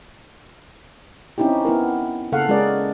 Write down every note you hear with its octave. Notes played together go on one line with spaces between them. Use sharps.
C4 C#4 D#4 E4 G4
B3 E4 A#4
C#3 A#3 A4 F5 F#5
G#3 C#4 G#4 A#4 D5